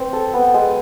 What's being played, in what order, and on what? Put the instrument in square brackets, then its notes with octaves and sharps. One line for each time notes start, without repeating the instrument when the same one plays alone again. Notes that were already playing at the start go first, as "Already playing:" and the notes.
Already playing: [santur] C4 [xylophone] B4
[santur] A4
B3
G#3